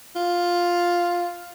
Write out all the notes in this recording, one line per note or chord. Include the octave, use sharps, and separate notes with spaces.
F4